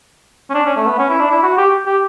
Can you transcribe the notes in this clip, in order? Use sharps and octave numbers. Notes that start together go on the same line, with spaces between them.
C#4
D4
C#4
A3
B3
C#4
E4
D4
E4
F#4
G4
G4